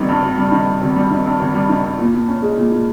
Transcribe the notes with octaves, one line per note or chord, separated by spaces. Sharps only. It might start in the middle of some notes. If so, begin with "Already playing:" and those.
Already playing: G#1 D#3 G3
G2
G#1
G3
D#3
G2
G#1
G3
D#3
G2
G#1
G3
D#3
G2
A#2
A#2
C#4
G#3
A#2
A#2